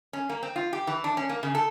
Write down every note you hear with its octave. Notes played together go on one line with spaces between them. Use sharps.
C#4
A#3
C4
F4
G4
E3
D4
C#4
A#3
C#3
A4